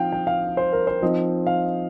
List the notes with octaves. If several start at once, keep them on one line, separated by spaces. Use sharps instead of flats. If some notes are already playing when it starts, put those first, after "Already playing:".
Already playing: F3 C4 D#4 F5 G5
G5
F5
C5
A#4
C5
F3 C4 D#4 D#5
F5